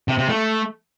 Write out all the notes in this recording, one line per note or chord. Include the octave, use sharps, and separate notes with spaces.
C3
C3
A3